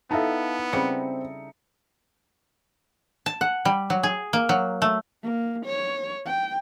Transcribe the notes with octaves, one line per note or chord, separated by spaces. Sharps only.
B3 D#4 E4 A4 F5 A5
C#3 G3 C4 F#5 C#7
A5
F#5
G3
F#3
G#4
A#3
F#3
A3
A#3
C#5
G5